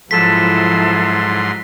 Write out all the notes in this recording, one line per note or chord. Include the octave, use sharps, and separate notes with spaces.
G#2 F3 F#3 E4 A4 C6 B6